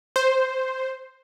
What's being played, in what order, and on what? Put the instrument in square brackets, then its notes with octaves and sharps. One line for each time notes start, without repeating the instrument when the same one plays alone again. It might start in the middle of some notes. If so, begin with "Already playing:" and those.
[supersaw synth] C5